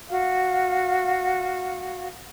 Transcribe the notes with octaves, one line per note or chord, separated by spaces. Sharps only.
F#4 F5